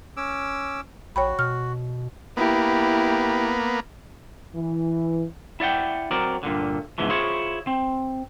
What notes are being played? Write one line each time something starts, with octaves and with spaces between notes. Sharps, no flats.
C#4 D6 E6
A#1 F#4 C#5 G5 B5
B2 F6
A#3 B3 E4 G4
E3
E4 D5 F#5 G5
F#3 C4 A#4 D5
G2 A#2 D3
E2 G#2 C#3 E3 F3
E4 F4 G#4 C5 C#5
C4